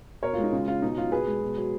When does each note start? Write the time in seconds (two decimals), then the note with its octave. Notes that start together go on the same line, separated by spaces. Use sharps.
0.23 B2 A#4 C#5
0.33 G#3 F4
0.43 D#4
0.53 C#3 F4
0.68 C#3 F4
0.82 B2 D#4
0.98 F#3 F4
1.12 B2 G#4 B4
1.27 G#3
1.42 B2
1.57 F#3